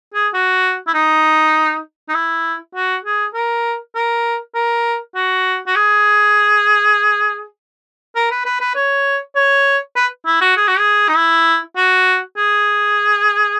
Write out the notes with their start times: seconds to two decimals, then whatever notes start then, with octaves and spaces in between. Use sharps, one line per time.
0.14 G#4
0.34 F#4
0.87 E4
0.93 D#4
2.09 D#4
2.14 E4
2.75 F#4
3.04 G#4
3.34 A#4
3.95 A#4
4.55 A#4
5.15 F#4
5.67 F#4
5.75 G#4
8.16 A#4
8.31 B4
8.45 B4
8.61 B4
8.75 C#5
9.36 C#5
9.96 B4
10.26 E4
10.41 F#4
10.57 G#4
10.68 F#4
10.79 G#4
11.08 D#4
11.16 E4
11.76 F#4
12.37 G#4